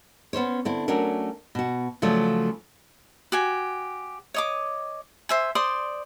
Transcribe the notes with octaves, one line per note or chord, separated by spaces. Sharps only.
B3 C#4 C5 C#5
D3 C4 E4
F#3 A3 C#4 D4 F#4 A#4
B2 F#4
C#3 F3 F#3 A3 D5
F#4 G4 G#5
C#5 D#5 D6
C5 E5 G#5
C5 D5 C6 D#6